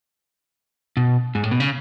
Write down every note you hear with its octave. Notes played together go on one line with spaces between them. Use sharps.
B2
G#2
A2
B2
C#3